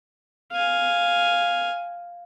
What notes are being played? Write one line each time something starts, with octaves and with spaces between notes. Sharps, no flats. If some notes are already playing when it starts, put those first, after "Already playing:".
F5 G#5